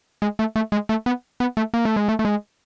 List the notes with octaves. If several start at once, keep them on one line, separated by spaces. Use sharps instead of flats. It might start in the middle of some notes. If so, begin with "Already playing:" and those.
G#3
A3
A3
G#3
A3
B3
B3
A3
A#3
A3
G#3
A3
A3
G#3